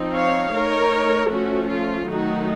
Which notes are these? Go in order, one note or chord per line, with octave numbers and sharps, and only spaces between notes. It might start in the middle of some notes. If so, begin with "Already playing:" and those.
Already playing: F3 C4 D#4
C#5 F5
A3 D#4 A#4 C#5
F3 A3 C#4 F#4
F4
D#3 F#3 A3 D#4 F#4